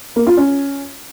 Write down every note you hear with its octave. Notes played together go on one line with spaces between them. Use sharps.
A#3
F4
C#4